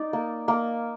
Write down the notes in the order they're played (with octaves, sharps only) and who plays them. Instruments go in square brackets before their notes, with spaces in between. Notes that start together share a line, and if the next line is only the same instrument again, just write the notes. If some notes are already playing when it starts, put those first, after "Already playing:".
Already playing: [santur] D#4 D5
A#3
A#3